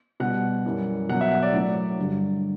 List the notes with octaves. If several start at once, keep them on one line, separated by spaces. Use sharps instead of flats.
B2 G3 F#5
F#2 E3 G3
B2 F#3 F#5
E5
F#5
D5
A2 F#3
G2 D3 G3